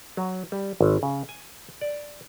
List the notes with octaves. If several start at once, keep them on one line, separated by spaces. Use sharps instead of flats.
F#3
G3
G#1
C#3
G#5
D5